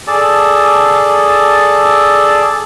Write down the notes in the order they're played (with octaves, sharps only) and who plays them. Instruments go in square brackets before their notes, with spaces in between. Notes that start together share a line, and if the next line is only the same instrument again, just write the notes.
[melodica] G#4 A4 D5 A5